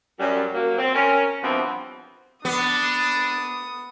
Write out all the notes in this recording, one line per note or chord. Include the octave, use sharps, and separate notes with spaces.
F#2 G3
F#3 A#3
C4
C#4 A#4
G2 B2 E3 F3 B3 C4
B3 D4 D#6